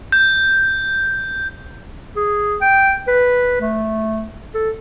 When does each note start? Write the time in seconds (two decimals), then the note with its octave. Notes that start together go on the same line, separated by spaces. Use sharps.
0.12 G6
2.17 G#4
2.61 G5
3.08 B4
3.61 A3
4.55 A4